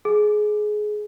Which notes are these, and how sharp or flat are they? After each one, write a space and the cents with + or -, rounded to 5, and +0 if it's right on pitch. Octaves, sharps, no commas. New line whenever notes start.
G#4 +20